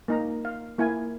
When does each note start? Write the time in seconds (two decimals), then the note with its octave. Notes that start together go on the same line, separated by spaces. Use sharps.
0.08 A#3 D#4 A#5
0.45 F5
0.78 A#3 E4 F5 G#5